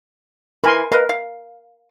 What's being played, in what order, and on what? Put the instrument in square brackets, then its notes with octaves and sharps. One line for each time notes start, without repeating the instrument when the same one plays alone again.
[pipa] E3 B5 [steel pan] A#4 G#5 C6
[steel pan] A#4 [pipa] B4 D#5 F5
[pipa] F5